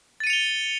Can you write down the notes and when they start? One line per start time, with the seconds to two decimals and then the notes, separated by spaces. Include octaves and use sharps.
0.20 A6
0.24 D#7
0.27 C#7
0.30 F7
0.33 G7